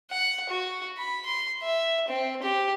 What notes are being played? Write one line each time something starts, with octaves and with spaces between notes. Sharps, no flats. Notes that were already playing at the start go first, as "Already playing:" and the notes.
F#5
F#4
B5
C6
E5
C4
G4